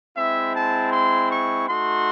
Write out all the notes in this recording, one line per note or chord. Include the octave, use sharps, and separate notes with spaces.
G#3 C4 E4 E5
A5
C6
C#6
A3 D#4 F#4 C6